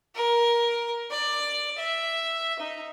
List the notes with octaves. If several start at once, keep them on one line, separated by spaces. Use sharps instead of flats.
A#4
D5
E5
D#4